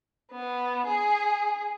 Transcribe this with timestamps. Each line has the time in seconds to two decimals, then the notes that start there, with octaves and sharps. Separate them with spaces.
0.31 B3
0.87 G#4